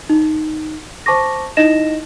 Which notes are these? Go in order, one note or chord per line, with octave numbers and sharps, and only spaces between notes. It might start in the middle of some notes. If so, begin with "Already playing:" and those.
D#4
C5 A5 C#6 D6 A#6
D#4 E4 D#5 A#6 E7